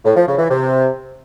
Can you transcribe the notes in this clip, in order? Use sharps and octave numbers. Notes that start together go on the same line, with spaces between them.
A2
F3
C#3
E3
C3